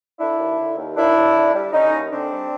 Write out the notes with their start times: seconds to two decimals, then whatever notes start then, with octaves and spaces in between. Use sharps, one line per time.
0.19 D3 D4 E4
0.38 D#2
0.58 D3
0.77 D#2
0.96 D#2 D4 E4
1.16 D#2
1.35 D3
1.54 G3
1.73 D3 C#4 D#4
1.92 D#2
2.12 D3 C4 D4
2.31 G3